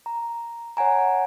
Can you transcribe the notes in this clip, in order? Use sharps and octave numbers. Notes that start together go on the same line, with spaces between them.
A#5
C#5 F#5 G#5 A#5